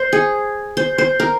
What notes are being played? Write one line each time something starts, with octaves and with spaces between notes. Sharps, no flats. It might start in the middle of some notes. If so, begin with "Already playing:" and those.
Already playing: C5
G#4
C5
C5
A#4